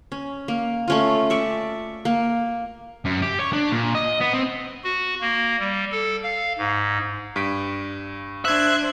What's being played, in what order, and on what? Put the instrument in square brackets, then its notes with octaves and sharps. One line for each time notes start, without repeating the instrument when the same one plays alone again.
[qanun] C#4
A#3
A3 C#4 F4
D5 E5 C#6
A#3
[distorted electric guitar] F#2
G4
C#5
D4
A#2
D#5
B3
C4
[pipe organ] F#4
A#3
G3
A4
F5
G#2
[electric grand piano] G2 B6 D7
[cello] D4 C5 [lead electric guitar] E5 [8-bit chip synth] F#6 G#6